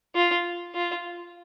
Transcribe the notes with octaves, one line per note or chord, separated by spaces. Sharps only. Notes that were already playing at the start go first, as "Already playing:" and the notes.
F4
F4